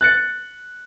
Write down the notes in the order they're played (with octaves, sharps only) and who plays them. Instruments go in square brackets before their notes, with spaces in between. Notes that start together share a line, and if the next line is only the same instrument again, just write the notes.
[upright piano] F#6 A6 C#7